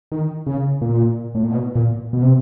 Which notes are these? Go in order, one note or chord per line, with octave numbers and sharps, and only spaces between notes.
D#3
C#3
A#2
A2
A#2
B2
A#2
B2
C3